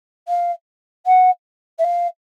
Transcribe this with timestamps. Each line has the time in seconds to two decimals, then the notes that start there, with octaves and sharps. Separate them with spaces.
0.28 F5
1.06 F#5
1.78 E5
1.84 F5